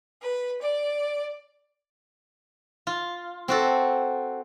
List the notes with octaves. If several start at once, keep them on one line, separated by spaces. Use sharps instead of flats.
B4
D5
F4
C4 F#4 A4